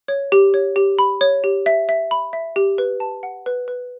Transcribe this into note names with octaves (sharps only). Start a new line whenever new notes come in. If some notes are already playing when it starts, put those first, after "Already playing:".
C#5
G4
C#5
G4
B5
C#5
G4
E5
E5
B5
E5
G4
B4
A5
F#5
B4
B4